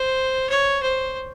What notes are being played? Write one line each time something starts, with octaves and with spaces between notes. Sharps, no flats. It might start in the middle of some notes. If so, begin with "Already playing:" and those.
Already playing: C5
C#5
C5